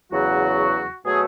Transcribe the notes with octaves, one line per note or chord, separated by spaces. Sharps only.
E2 C#3 F#3 F#4
B2 F#3 A3 G#4